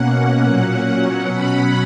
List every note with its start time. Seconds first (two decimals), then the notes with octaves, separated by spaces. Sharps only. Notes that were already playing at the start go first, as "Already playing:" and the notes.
Already playing: B2 A#3 C#4 F#5
0.43 A#2 F#3 A#3 C#4
1.00 B2 F#3 C#4 F#5
1.30 B5